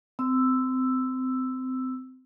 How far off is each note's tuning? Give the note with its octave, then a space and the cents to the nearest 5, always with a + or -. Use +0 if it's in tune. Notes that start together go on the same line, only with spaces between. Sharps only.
C4 -25 E6 +0